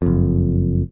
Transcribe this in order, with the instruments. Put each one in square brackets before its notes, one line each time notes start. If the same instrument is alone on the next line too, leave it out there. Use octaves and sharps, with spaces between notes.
[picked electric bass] F#1 F2